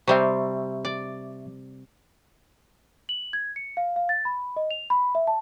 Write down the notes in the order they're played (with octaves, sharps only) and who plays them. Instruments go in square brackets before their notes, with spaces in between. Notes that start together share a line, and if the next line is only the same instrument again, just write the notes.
[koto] C3 G3 C4 [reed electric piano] E5 C#6
[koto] D5
[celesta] F#7
G#6
C#7
F5
F5
A6
B5
D#5
F7
B5
E5
A5